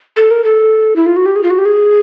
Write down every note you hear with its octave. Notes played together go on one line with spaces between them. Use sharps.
A4
A#4
A4
E4
F4
F#4
G4
G#4
F4
F#4
G4
G#4